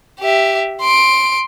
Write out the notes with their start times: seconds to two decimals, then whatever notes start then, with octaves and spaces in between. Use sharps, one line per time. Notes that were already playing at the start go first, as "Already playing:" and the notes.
0.20 G4 E5
0.82 C6 D7